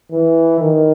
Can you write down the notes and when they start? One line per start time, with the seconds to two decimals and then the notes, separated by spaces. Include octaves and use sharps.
0.12 E3
0.60 D#3